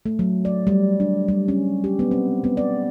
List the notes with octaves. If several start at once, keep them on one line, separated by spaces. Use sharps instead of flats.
A3
F#3
D5
G3
D4
G3
C#4
G4
B3
C4
B3
D5